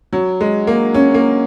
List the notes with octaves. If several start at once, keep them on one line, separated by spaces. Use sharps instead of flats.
F#3
G#3
A#3
C#4
A#3